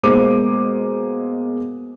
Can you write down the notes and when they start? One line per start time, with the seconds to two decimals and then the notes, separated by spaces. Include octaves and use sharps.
0.03 B2 G#3 A#3 C5 D6 D#7